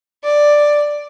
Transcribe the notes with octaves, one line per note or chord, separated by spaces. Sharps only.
D5